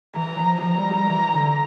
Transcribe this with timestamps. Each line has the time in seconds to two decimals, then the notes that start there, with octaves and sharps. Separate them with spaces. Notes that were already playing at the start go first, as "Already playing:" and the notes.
0.16 E3 A#5
0.40 F3
0.62 F3 A#5
0.78 G3
0.94 G3
1.09 E3
1.34 D3